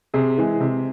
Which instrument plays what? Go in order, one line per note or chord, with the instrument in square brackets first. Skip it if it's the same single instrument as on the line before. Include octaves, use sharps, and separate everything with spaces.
[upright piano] C3 G#4
E3 G#3
C3